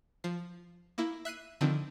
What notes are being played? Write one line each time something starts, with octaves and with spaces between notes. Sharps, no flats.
F3 C7
A#3 E4
E5 F#6 C7 D#7
D3 D#3 F3 C4